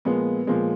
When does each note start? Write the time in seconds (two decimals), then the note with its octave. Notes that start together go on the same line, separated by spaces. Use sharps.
0.05 A#2 F3 G#3 B3
0.47 A#2 F3 G#3